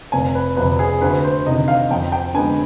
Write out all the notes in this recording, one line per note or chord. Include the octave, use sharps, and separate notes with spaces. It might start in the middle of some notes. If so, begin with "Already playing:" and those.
F1 G#5
B4
F2 C3 B4
G#4
D2 B4
C5
C3 D#3 D#5
F5
F2 G5
G5
D3 G#3 B3 G#5